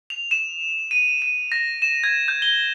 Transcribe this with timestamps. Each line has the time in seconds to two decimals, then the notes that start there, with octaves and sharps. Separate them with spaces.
0.10 F7
0.31 E7
0.91 D#7
1.22 D#7
1.52 A#6
1.82 E7
2.04 G#6
2.28 G6
2.42 G7